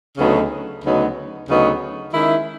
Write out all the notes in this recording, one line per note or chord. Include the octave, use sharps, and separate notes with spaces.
D2 C#3 F#3 B3 D#4
D2 C#3 F#3 B3 D#4
D2 C#3 F#3 B3 D#4
D#3 G#3 C#4 E4